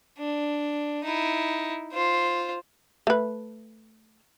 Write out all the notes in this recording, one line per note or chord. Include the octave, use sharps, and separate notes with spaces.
D4
D#4 E4
F4 C5
A3 B4